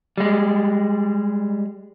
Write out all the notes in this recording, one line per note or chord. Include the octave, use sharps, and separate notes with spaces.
G3 G#3